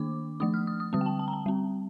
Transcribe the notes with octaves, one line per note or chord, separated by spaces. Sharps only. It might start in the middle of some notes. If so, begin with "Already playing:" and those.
Already playing: D#3 A#3 D4 D6
F3 A3 D4 D#6
F6
D#6
D#6
D3 G3 C4 D#6
G5
A5
A5
A#5
A5
G3 C4